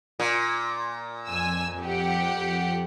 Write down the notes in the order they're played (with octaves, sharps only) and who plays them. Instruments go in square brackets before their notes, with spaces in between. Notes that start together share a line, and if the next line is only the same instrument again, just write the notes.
[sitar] A#2
[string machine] F2 [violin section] G#5 E6
[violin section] G4 F#5